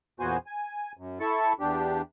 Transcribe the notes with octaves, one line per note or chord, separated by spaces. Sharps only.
E2 A#2 B3 F#4 C5 G#5
G#5
F#2
E4 A4 A5 C#6
E2 D4 G4